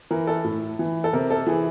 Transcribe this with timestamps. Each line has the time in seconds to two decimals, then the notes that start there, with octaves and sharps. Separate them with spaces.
0.11 E3 A#4
0.27 A4
0.44 A2
0.79 E3
1.04 A4
1.13 C3 A#4
1.31 A4
1.47 E3 G#4